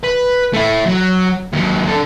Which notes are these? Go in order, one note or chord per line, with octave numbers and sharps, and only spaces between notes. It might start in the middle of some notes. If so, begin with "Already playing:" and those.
B4
A3 E4
F#3
D#2 F#3
D3 A4